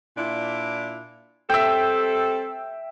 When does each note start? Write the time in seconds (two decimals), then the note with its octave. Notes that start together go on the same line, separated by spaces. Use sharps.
0.17 A#2 D4 E4
1.50 G3 C4 A4 E5 G5